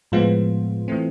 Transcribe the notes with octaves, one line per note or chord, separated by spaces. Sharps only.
A2 F3 G#3 B3 F4
E3 A3 C4